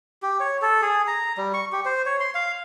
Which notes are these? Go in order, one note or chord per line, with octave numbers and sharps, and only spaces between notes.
G4
C#5
A4
G#4
A#5
G3
C#6
G4
C5
C#5
C6
F5